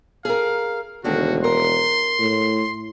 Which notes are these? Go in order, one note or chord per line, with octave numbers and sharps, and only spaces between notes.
G#4 A#4 F5
E1 D3 D#3 A3 F#4
A#4 C6
A2